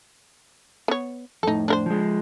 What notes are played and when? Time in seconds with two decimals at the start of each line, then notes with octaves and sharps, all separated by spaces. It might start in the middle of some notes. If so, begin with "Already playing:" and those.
0.88 B3 C#5
1.43 F2 A2 D#4 A4
1.68 D4 A#4 C5
1.86 F3 G#3